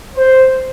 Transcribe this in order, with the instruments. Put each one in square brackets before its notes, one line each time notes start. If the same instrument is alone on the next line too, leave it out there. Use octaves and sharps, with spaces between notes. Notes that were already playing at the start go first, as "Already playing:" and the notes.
[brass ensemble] C5